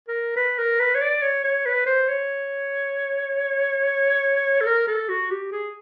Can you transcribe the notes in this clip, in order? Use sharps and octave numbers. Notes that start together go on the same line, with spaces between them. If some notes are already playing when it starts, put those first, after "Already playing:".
A#4
B4
A#4
B4
C#5
D5
C#5
C#5
B4
C5
C#5
A4
A#4
A4
F#4
G4
G#4